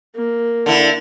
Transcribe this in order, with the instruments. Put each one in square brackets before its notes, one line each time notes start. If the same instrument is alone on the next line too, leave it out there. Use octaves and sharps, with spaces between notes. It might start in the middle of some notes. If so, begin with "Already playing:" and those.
[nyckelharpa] A#3
[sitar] D3 E4